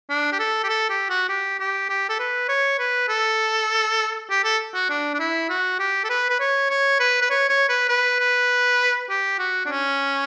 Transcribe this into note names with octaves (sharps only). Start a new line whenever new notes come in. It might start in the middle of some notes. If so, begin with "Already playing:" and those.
D4
G4
A4
G4
A4
G4
F#4
G4
G4
G4
A4
B4
C#5
B4
A4
G4
A4
F#4
D4
D4
E4
F#4
G4
A4
B4
B4
C#5
C#5
B4
B4
C#5
C#5
B4
B4
B4
G4
F#4
D4
C#4